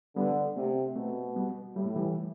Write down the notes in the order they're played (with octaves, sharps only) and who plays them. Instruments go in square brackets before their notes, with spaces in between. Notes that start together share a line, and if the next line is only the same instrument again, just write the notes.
[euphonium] D3 [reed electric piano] G3 B3
[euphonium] C3 [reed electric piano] A3 C4
[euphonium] B2 [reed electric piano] A3 C4
[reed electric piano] G3 B3
[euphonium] A2 [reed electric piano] G3
[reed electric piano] A3
E3 G3